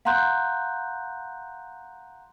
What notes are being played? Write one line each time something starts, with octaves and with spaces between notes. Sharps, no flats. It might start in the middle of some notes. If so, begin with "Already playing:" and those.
F5 F#5 A#5 C6 F#6 G6